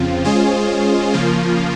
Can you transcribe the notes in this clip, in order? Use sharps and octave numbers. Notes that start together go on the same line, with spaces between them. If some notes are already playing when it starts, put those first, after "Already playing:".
Already playing: F2 C#3 F3 C4 F4
G#3 C#4 F4 G#4 C5
C#3 F3 A#3 F4